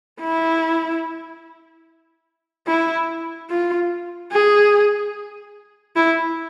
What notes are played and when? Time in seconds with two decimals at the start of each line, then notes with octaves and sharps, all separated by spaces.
0.21 E4
2.67 E4
3.50 F4
4.32 G#4
5.96 E4